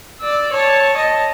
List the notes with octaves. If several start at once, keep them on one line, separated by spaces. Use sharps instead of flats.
D5 E6
C#5 A5
D#5 A5